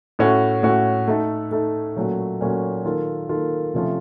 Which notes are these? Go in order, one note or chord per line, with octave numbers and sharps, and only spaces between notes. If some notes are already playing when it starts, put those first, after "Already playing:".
A2 A3 C#4 F#4
A2 A3 C#4 F#4
A3 D#4 A4
A3 D#4 A4
A#2 F#3 A3 C#4 F#4
A#2 F#3 A3 C#4 F#4
D#3 A#3 F4 A4
D#3 A#3 F4 A4
C3 F3 A3 C#4 F4